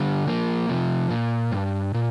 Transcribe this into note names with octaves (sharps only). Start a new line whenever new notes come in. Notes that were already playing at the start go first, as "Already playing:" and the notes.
Already playing: D3 G3
F3 A#3
C3 F3
A#2
G2
A#2